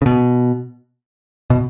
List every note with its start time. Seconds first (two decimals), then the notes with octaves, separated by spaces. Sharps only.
0.02 C#3
0.06 B2
1.50 B2